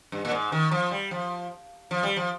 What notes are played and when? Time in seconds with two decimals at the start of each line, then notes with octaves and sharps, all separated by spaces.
0.12 G2
0.25 A#2
0.32 G#2
0.52 D#3
0.71 F3
0.91 G3
1.11 F3
1.91 F3
2.03 G3
2.16 F3